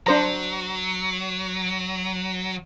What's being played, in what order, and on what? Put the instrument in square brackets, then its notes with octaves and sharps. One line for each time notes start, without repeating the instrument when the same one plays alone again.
[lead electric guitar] F#3 [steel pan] D4 C5 A#5